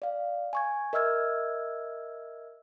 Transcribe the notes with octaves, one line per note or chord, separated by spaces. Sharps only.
D5 F5
G#5 C#6 G#6
A#4 D#5 E5 E6 F6 G#6